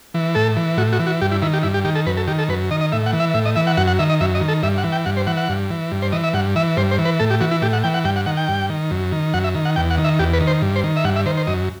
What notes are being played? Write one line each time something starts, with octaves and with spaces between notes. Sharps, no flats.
E3
A2 A4
E3
A2 F#4
F#4
E3
F#4
G2 G4
E4
D#3 E4
G4
G2 E4
G4
D#3 G4
A4
F#2 B4
A4
D#3 G4
A4
F#2 B4
D#3 D#5
D#5
A2 E5
F#5
E3
E5
A2 E5
D#5
E3 E5
F#5
F#2 F#5
F#5
D#3 E5
D#5
F#2 E5
D#5
D#3
A4
G2 E5
F#5
E3
G5
G2 F#5
C5
E3 F#5
F#5
G2
E3
G2
C5
E3 D#5
E5
G2 F#5
E3 E5
G2 C5
C5
E3
B4
A2 A4
G4
E3 F#4
E4
A2 G4
F#5
E3 G5
F#5
G2 G5
F#5
D#3 F#5
G5
G2
D#3
F#2
D#3
F#2 F#5
E5
D#3
F#5
E2 G5
F#5
D#3
E5
E2 G4
B4
D#3
C5
G2
C5
D#3
E5
G2 F#5
E5
D#3 C5
C5
F#2 D#5